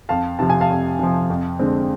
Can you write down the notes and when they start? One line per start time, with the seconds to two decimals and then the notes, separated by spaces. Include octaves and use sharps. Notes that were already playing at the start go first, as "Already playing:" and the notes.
0.09 F2 F5 A5
0.39 C3 F3 A5
0.50 G#5
0.61 F5 A5
0.70 F2
0.99 C3 F3
1.30 F2
1.59 D3 G#3 C4